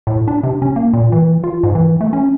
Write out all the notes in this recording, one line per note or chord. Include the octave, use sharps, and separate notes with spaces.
A2
D4
C3
C#4
A#3
A#2
E3
F4
G#2
E3
A3
C#4